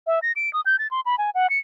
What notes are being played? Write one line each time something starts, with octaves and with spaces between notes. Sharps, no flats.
E5
A#6
D7
D#6
G6
A6
C6
B5
G#5
F#5
C#7